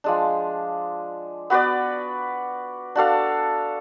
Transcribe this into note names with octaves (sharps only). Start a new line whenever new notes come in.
F3 G#3 D4
B3 F#4 B4 D5
D4 F#4 A4 F5